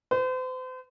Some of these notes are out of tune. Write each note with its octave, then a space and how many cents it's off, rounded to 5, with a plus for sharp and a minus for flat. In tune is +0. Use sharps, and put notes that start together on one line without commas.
C5 -40